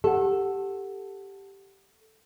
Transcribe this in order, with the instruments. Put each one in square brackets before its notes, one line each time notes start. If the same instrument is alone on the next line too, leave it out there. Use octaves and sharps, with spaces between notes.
[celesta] G4 F#5 [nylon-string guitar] A4